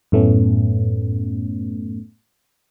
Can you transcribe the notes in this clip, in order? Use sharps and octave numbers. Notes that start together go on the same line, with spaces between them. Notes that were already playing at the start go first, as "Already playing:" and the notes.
F#2 A2 A3 B3 C#4